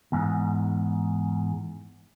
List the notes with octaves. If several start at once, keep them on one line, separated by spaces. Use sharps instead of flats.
E2 G#2